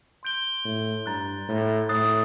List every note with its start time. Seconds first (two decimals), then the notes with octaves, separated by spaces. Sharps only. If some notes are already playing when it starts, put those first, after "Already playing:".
0.23 C6 G6 D7 G7
0.65 A2
1.06 G2 A#5 F#6 A6
1.48 A2
1.89 A2 D#6 F#6 A6 C7